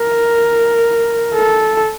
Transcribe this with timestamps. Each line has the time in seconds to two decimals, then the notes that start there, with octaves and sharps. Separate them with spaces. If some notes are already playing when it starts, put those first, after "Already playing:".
Already playing: A#4
1.34 A4